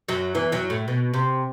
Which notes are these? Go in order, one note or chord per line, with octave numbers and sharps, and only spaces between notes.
F#2 F#3
E2 E3
F#2 F#3
A2
B2
C3